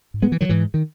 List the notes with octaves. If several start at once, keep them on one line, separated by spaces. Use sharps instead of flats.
G#2
G#3 B3
E3
D#3 F#3
G#2 E3
D#3